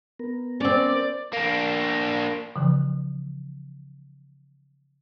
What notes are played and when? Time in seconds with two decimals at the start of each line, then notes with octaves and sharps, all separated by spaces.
0.19 B3 A#4
0.60 C4 C#4 D5
1.33 A#3 D4
2.56 C#3 E3 F3